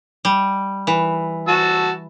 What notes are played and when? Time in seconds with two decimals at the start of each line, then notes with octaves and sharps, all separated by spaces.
0.25 G3
0.87 E3
1.48 F#4 A5 E6